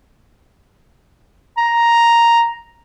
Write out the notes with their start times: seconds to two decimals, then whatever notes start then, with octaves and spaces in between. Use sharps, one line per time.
1.58 A#5